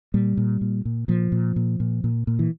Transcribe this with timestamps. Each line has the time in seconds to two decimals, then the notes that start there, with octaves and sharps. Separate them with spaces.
0.14 A#2 G3
0.37 A#2
0.61 A#2
0.85 A#2
1.08 A#2 F3
1.32 A#2
1.56 A#2
1.80 A#2
2.04 A#2
2.27 A#2
2.39 E3